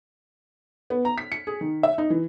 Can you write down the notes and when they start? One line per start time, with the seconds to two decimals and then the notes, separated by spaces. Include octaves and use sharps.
0.90 B3
1.05 A#5
1.18 B6
1.32 C#7
1.47 G#4
1.61 D#3
1.83 E5
1.98 D#4
2.10 E3